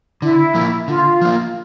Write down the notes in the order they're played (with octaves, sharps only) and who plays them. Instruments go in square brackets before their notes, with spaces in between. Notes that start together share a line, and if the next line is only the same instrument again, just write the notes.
[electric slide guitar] D3 [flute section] E4
[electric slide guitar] F3 A#3
[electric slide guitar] D3 [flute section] F4
[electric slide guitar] F3 A#3